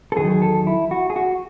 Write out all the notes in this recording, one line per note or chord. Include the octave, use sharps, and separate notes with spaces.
A4
E2 D#3 F#3 G#4
G#4
A4
E4
F#4
G#4
F#4